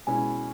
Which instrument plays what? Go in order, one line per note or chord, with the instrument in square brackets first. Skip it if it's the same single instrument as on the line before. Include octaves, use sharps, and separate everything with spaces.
[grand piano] B2 G#3 C#4 E4 [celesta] G#5